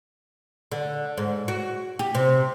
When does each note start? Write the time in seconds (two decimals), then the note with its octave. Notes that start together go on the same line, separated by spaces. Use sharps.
0.72 D3
1.17 G#2
1.48 F#4
1.99 G4
2.15 C3